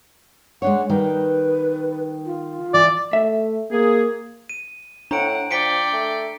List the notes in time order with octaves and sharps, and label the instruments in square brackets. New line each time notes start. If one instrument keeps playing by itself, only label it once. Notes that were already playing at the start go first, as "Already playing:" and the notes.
[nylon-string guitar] G#3 D4 C#5 [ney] F#5
[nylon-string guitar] D#3 G3 [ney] B4
[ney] F4
[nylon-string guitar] E3 [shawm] D5
[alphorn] A3 [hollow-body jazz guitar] E5
[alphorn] A#3 [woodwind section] G#4
[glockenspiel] D#7
[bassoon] A2 [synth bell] D4 [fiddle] F#5 [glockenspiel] A#5 D7
[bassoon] F3 [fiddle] D5 G5 [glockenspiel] B6 C#7 D7
[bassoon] A3